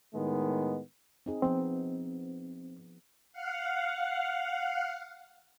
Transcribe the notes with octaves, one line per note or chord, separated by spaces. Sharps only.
A2 D#3 G#3 B3
C4 D#4 G#4
F3 B3 C4
F5 F#5